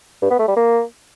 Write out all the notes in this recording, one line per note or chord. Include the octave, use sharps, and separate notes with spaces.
G2
B3
A3
G3
A#3